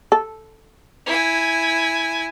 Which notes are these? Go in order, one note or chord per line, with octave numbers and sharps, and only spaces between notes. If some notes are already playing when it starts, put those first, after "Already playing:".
A4
E4 G#5